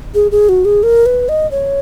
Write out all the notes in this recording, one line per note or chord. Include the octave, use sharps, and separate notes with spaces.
G#4
G#4
F#4
G#4
A#4
B4
D#5
C#5